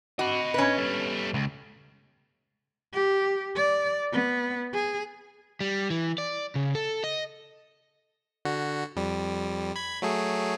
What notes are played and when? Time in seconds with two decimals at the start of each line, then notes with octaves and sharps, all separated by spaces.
0.19 F#4 D#5 B5
0.54 C#4 B4
0.78 G3 A4
1.34 C#2
2.93 G4
3.56 D5
4.12 B3
4.74 G#4
5.61 G3
5.90 E3
6.18 D5
6.55 C#3
6.75 A4
7.04 D#5
8.45 D3 F#4
8.96 F2 G3
9.76 B5 G#6
10.02 F#3 A3 G#4